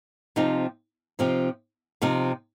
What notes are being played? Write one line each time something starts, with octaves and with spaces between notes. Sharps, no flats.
C3 F3 C4 D#4
C3 F3 C4 D#4
C3 F3 C4 D#4